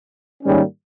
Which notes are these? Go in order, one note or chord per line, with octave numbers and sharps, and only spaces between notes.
G#2 D#3 G3 A#3 C#4